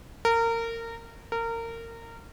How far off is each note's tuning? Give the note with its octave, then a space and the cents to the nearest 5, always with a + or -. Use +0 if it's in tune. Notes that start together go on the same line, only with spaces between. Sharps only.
A#4 -25
A#4 -25